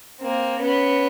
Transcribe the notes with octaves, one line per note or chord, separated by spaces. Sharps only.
A#3 C4
B3 C#4